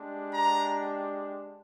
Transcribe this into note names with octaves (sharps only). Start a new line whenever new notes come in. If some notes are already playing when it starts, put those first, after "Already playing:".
Already playing: G#3 D4 G4
A#5